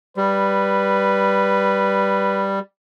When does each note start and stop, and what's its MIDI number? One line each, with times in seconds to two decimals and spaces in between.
0.17 2.59 55
0.17 2.59 71